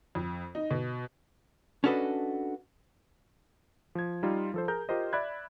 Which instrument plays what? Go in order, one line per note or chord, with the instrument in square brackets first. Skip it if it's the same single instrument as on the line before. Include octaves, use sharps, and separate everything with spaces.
[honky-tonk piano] F2
D#4
B2
[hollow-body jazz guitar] C#4 D4 F#4 A4 B4 D#5
[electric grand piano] F3 G#6
G3 D#4 F4
F3 A4 C5
G#4 A#4 A#5 G6
F4 G4 A#4 C5 D#5
D5 E5 B5 F#6 G#6